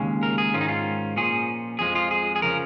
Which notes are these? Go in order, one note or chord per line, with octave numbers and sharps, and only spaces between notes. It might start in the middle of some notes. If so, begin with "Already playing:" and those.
Already playing: D#2 C#3 G#3 C#4
A#4
G#4
G#2 D#3 C#4 F4
D#4
F4
A#2 F3 C#4 G#4
F2 F3 G#3 G#4
F4
G#4
G#4
C#3 F3 C#4 A#4